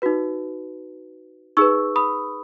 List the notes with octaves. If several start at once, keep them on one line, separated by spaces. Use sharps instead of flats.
D#4 F#4 B4
D#4 G#4 B4 C#6 E6
B5 D#6